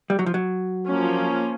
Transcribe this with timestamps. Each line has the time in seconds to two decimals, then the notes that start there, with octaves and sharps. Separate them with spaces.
0.10 G3
0.19 F#3
0.26 F3
0.34 F#3
0.88 F3 A#3 C#4